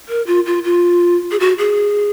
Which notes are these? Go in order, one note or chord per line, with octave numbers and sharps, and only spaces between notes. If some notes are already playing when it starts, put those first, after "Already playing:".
A#4
F4
F4
F4
G#4
F#4
G#4